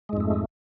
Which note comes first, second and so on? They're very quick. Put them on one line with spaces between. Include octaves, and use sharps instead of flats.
G#3 G#2 F2 A3